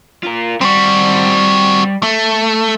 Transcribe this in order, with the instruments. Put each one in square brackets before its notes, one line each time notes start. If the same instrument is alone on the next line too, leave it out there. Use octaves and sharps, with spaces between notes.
[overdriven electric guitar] F4 A#4
[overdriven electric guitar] G3 [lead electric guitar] C4 F#4
[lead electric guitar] A3